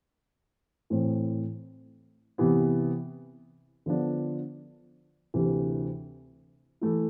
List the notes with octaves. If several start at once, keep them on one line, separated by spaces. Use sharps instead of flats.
A2 E3 A3 C4
C3 E3 B3
D3 F3 B3 D4
D2 C3 E3
E3 A3 E4